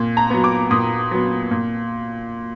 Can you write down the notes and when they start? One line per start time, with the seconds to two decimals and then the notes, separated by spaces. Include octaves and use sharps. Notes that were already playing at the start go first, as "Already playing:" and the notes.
Already playing: A#2
0.17 A#5
0.30 F#3 B3
0.44 D6
0.71 A#2 D#6
1.11 F#3 B3
1.51 A#2